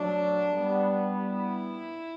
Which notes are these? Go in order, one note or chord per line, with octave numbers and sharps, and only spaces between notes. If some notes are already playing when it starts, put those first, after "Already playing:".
Already playing: F#3 A3 D4
G3 B3
E4